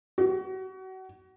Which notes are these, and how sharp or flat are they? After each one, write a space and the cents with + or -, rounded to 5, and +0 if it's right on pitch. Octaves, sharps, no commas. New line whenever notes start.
F#4 +30